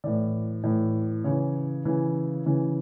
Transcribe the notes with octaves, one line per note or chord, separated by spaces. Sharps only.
A2 E3 D5
A2 E3
C#3 E3 C#5
C#3 E3
C#3 E3